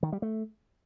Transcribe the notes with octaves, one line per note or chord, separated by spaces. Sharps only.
D#3
G3
A3